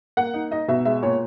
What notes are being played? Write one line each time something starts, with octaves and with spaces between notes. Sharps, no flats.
A#3 F#5
D#4
D#4 D#5
B2 E5
G#3 E5
A#2 C#5